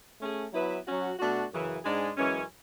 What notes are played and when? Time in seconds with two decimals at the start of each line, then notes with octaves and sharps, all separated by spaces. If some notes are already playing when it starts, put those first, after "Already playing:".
0.20 A3 C#4 G#4
0.53 F#3 B3 E4 B4 E5
0.87 F#3 C#4 F#4
1.19 B2 A3 D4 F#4
1.52 F#2 C#3 E3
1.84 G#2 G#3 D4 G#4 D5
2.17 F#2 E3 G#3 C#4